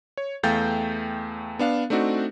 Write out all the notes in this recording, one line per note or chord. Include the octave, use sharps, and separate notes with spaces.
C#5
E2 A3 F5 G5 G6 A6
B3 D4 F5
A3 C4 D4 D#4 F#4